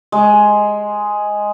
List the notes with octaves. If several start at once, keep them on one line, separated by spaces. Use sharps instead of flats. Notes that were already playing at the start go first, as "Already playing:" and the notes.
G#3